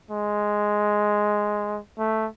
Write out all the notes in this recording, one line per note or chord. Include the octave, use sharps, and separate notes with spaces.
G#3
A3